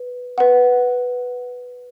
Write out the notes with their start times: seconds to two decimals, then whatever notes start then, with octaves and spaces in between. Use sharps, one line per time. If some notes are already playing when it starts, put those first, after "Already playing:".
Already playing: B4
0.38 B4 F#5